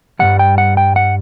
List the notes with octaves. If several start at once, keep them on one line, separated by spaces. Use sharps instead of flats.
G2 E3 G3 F#5
G5
F#5
G5
F#5